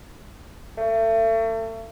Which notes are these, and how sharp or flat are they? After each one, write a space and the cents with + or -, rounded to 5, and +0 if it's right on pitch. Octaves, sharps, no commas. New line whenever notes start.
A3 +35